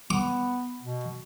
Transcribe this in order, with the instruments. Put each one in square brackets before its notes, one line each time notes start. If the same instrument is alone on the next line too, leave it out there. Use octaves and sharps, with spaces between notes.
[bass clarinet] B3 [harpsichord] D6
[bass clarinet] B2